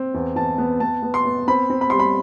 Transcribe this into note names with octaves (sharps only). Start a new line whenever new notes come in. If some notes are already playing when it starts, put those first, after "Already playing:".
Already playing: C4
E2
E2 A5
B3
B3 A5
B3
C6
B3
C4 B5
C4
B5
G3 C6
B5